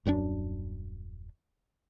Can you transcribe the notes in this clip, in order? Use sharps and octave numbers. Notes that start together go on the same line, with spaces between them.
D#1 F#2 G3 D4